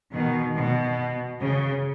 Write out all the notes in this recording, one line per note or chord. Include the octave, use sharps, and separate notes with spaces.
B2 D#3
B2
C#3